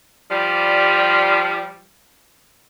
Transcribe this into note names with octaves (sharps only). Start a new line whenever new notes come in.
F3 G3